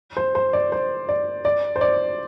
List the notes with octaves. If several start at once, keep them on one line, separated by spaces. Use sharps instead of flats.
C5
C5
D5
C5
D5
D5
C5
D5